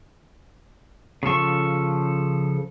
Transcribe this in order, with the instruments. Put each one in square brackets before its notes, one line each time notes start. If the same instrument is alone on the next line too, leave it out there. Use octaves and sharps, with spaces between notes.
[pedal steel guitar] C#3 F3 A4 C#6